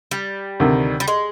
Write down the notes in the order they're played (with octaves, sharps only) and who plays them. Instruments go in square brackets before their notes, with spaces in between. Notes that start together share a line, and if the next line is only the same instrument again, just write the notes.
[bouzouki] G3
[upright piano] D2 C3 D#3
[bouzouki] G3
G#3